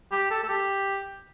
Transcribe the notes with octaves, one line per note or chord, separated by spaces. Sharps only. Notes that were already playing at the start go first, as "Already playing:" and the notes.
G4
A4
A4
G4